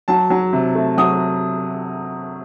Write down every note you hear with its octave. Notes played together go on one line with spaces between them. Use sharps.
F#3 A5
F#3
C3
A3
F#3 D#6